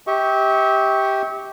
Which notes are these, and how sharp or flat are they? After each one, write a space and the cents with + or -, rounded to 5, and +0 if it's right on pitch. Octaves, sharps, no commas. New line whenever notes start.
G4 +0 E5 -40 C#6 +0